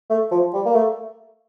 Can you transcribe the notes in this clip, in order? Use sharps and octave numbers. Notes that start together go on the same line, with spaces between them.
A3
F3
G3
A#3
A3